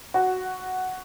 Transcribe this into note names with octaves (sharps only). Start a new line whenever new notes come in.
F#4